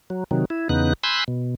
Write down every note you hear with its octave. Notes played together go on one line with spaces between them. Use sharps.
F#3
C3 D#3 F#3
E4
E2 C#3 B3 D#4 F#6
G#5 B5 C6 E6 F#6 G6
B2